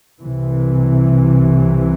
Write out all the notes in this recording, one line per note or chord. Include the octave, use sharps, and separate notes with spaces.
C2 C3 E3